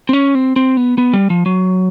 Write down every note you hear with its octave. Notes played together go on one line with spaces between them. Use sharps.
C4
C#4
C4
C4
B3
B3
G3
F3
F#3